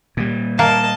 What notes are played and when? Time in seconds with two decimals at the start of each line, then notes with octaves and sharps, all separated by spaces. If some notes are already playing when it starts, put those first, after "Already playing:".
0.17 A#2 G3
0.59 A#3 D#5 A5